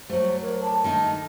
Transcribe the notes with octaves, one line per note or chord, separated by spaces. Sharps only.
F#3 A3 C5
A#4
A5
D#3 A3 D#4